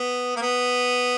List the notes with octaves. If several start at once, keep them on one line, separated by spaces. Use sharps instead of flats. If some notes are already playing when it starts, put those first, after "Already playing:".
Already playing: B3
A#3
B3